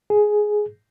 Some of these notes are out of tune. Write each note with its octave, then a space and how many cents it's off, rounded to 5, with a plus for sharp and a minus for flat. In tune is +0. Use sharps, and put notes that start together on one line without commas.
G#4 +10